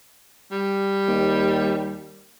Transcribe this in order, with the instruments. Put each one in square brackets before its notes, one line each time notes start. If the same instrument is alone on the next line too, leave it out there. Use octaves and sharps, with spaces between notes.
[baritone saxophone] G3
[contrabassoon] D#2